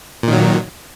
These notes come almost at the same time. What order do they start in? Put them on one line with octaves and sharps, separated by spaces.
A#2 D#3 F#3